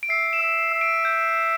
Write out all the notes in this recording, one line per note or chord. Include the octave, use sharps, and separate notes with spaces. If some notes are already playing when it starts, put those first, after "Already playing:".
D7
E5 C7
D7
E7
E5
E5
D7
G6